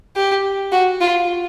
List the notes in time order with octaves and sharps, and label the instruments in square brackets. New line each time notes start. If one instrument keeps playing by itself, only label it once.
[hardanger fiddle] G4
F#4
F4